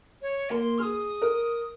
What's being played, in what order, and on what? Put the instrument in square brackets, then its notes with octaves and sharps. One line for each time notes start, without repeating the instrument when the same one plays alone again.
[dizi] C#5
[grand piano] A#3 [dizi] C6
[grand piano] G#4 [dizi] D#6 F6
[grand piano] A#4